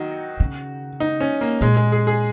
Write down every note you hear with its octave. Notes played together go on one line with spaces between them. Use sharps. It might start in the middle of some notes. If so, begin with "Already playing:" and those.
Already playing: D#3 F#3 D#4 F#4
C#3
D#4
C#4
A#3
A#2 G#3
G#3
G#4
G#4